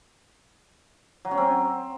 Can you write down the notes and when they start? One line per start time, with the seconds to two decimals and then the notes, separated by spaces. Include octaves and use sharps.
1.25 F#3
1.31 C#4
1.37 C4